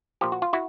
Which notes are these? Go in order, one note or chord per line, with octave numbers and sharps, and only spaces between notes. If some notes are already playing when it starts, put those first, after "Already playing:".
A#2 F3 G4
F#4
F4
E4 F#4